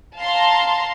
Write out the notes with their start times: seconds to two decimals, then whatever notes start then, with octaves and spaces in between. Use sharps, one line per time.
0.18 F5 A5 A#5 C6